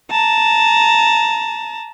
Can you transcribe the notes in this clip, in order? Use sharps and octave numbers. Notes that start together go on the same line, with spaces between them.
A5 A#5